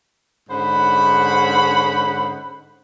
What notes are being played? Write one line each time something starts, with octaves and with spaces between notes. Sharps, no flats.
G#2 D3 C#4 C5 F#5 B5